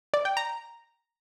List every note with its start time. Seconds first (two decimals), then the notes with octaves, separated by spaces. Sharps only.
0.14 D5
0.25 G5
0.37 A#5